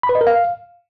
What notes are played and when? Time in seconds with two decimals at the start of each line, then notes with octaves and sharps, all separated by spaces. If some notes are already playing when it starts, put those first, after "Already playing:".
0.03 B5
0.09 B4
0.15 D#5
0.21 A#4
0.27 F5